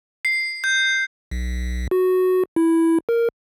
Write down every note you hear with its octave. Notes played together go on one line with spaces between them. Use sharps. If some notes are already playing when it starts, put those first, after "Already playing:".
C7
G6
B1
F#4
E4
A#4